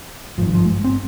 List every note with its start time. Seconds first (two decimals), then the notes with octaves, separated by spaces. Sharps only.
0.38 G#1 F3
0.41 G2 D#3
0.54 F3
0.66 G#3
0.84 C4